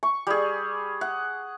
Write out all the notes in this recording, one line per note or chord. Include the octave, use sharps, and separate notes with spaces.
C#6
G3 G#4
F#5